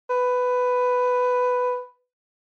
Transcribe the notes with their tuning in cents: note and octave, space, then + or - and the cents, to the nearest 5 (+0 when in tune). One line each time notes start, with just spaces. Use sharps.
B4 +10